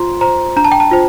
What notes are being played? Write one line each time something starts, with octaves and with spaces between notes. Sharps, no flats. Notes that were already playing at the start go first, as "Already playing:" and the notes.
Already playing: F4 C5 A#5 C6
C5 A#5
D4 A#5
A5
G5
A5
F4 C5